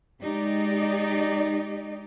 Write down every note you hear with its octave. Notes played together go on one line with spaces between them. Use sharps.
G#3 D#4 G4 D5 D#5